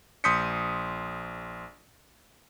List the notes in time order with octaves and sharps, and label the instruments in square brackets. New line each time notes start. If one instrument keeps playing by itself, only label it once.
[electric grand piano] A#1 C6 D#6 G6 B6 C#7